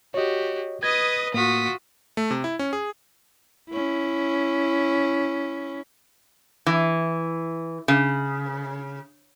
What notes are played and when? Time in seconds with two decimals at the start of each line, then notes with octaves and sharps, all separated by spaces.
0.14 F#4 G4 C#5 D#5
0.83 B4 D#5 D#6 G#6
1.34 A2 A#3 F4 F#4 D#6 B6
2.17 A3
2.31 C3
2.44 E4
2.59 C#4
2.73 G#4
3.70 C#4 E4
6.66 E3
7.88 C#3